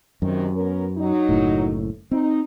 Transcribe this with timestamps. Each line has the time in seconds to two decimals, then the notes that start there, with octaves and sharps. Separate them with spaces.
0.22 F#2 C3 D#3
0.55 B3 C#4 A#4
0.97 F#3 D#4
1.29 F#1 A2
2.11 C4 D#4